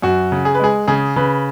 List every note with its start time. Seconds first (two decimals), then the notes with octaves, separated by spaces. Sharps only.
0.02 F#2 F#4
0.32 C#3
0.45 G#4
0.55 B4
0.60 G#3 G#4
0.88 C#3 G#4
1.16 C#3 B4